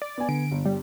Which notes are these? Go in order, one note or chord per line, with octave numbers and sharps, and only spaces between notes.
D5
B3 G#5
D3 D7
G1
G3